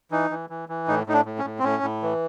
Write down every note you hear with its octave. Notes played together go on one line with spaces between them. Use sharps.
E3 D#4
E3
E3
E3
A2 D#4
A2 D#4
D4
A2
C#4
A2
C4
A2 C#4
A2
E3